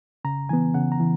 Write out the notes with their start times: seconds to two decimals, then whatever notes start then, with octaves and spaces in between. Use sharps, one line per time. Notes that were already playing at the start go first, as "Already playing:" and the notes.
0.25 C#3 A#5
0.49 E3 B3 G#5
0.74 C#3 F#5
0.92 A#5
1.00 E3